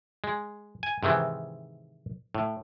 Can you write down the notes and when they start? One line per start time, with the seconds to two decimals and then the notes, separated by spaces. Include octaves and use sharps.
0.24 G#3
0.83 G#5
1.03 G#2 C3 D#3 E3
2.35 A2